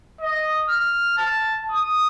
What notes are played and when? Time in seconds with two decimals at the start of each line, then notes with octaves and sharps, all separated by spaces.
0.21 D#5
0.69 F6
1.17 A5
1.71 D#6